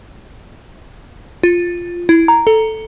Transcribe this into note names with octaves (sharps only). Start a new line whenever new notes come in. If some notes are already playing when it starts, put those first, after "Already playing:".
F4
E4
A#5
A4